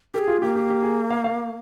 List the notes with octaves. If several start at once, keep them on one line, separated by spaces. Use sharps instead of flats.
G4 G#4 A#4
F4
A#3 G4
G4
G4
G#4
F5
F5